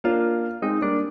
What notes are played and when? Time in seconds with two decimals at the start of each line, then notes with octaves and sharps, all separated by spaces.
0.04 A#3 D4 F4
0.62 G#3 C4 D#4
0.82 G3 A#3 D4